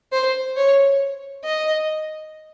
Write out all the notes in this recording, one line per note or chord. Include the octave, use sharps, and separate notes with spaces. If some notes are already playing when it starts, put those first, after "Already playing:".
C5
C#5
D#5